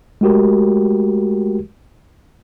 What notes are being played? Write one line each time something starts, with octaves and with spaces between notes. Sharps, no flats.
G#3 A3 F#4 G4 A#4